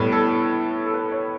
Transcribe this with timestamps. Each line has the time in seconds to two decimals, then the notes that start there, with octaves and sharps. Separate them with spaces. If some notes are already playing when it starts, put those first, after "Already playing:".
Already playing: A2 G3 B3 B4
0.12 A4
0.86 A4
0.94 B4
1.12 C#5